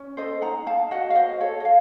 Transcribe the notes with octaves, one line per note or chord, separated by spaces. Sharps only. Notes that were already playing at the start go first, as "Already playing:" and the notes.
Already playing: C#4
A4 C5 D#5
D#4 F#5 A#5
D#4 F5 A5
F#4 D#5 F#5
F5
F#4 C5 D#5
A4 C#5
D#5
F5